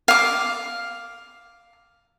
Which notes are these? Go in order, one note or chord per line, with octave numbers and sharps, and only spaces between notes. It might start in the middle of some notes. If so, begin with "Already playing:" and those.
F5 D6